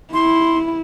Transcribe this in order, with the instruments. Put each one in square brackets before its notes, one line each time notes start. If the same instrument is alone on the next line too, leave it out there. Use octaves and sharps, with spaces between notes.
[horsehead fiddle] E4 [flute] C6